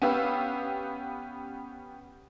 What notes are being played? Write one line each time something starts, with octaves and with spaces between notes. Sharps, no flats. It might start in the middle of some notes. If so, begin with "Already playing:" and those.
B3 C#4 G4 B4 F5 E6